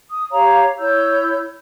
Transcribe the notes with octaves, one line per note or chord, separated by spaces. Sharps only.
D#6
G4 C#5 F5 A#5
E4 C#5 E6 G6